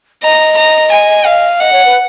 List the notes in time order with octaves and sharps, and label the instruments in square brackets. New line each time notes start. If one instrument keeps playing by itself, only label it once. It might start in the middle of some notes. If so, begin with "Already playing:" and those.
[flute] D#5 [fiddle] A#5
[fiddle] A#5
G#5
F5
[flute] D#5 [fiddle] F#5
[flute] C#5
B4